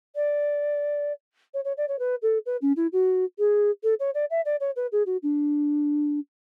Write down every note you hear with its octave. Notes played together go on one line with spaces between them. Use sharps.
D5
C#5
C#5
D5
C#5
B4
A4
B4
C#4
E4
F#4
G#4
A4
C#5
D5
E5
D5
C#5
B4
G#4
F#4
D4